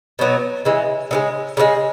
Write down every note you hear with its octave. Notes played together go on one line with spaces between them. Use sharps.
B2 F#3 B3
C#3 E3 G#3
C#3 E3 G#3
C#3 E3 G#3